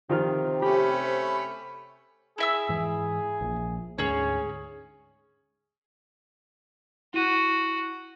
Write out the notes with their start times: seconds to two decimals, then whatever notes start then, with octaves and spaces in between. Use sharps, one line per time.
0.09 C3 D#3 F4 F6
0.62 A3 C#4 G4 B5
2.38 E4 G#4 E5 E6
2.69 G#2 E3
3.41 A#1 A#2
3.98 D2 G#2 C#4 G#4 C#5
7.14 E4 F#4 D#7